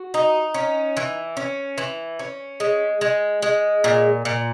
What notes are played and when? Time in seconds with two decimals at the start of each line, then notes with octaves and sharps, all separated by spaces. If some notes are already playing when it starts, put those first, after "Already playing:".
Already playing: F#4
0.14 D#4
0.54 C#4
0.97 E3
1.37 C#4
1.78 E3
2.19 C#4
2.60 G#3
3.01 G#3
3.42 G#3
3.84 A#2
4.25 A#2